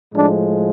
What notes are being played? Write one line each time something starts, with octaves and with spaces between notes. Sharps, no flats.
A2 F3 G#3 D4